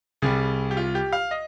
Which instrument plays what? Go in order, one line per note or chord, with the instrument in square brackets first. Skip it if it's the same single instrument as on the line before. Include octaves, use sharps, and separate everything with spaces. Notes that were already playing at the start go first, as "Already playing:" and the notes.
[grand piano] C2 C3 G3 G#4
G4
F4
G4
F5
D#5